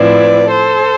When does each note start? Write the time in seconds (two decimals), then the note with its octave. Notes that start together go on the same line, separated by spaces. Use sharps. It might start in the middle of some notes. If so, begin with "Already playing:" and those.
Already playing: A2 F3 C4 E4 B4 D5
0.51 A4 C5